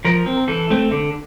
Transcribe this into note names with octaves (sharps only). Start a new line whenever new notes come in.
F3 A#4
C4
E3 A4
A3 C4
D3